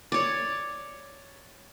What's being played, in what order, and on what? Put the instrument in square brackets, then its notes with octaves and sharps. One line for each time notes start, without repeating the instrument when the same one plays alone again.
[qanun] C#5 D5